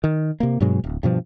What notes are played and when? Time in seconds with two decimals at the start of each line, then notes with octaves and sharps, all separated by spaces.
0.04 D#3
0.40 C3 A#3
0.60 G2 B2 F#3 G#3
0.84 D1
1.03 G2 B2 F3